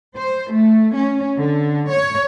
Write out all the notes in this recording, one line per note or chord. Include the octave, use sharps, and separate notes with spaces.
C5
A3
C#4
D3
C#5